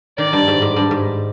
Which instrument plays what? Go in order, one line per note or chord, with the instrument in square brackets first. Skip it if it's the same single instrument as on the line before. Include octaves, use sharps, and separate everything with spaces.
[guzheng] D#3 [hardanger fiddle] D5
[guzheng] G2
G#2
G#2
G2
G#2